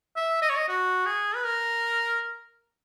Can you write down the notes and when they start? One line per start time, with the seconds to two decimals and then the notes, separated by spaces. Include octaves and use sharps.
0.16 E5
0.42 D#5
0.50 C#5
0.56 D#5
0.68 F#4
1.06 G#4
1.35 B4
1.45 A#4